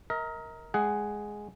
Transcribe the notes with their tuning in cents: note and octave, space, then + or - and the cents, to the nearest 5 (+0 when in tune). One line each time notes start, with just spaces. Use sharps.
A#4 +0 D#5 +40
G#3 +0 G#4 +0 F#5 +15